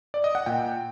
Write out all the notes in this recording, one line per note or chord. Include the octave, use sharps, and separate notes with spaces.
D5
D#5
F#5
A#2 G5